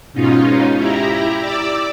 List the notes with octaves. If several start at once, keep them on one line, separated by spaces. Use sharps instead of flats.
G#2 B2 C#4 D#4 F4
E4 G4 A#5
D5 D6 E6